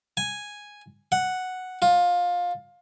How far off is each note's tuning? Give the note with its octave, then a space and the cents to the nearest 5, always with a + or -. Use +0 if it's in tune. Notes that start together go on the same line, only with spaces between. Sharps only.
G#5 -5
F#5 +0
F4 +20